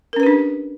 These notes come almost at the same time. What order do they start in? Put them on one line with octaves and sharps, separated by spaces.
A#4 C#4 B4 G4 D4